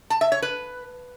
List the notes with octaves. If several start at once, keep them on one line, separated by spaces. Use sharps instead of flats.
A5
E5
C#5
B4